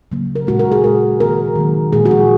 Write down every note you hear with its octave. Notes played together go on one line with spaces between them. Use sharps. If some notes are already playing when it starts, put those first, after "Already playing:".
C#3 F#3 A#3
A#4
A#2 G#3 F#4
A#4
G#4
A#2 G#3 A#4
D#3 A#3 A#4
D#3 F#3 A#3
A#2 F3 G#3 G#4
F#4
G#4